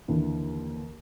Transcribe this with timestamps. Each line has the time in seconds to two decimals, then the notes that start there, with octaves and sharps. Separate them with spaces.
0.08 D#2 D3 E3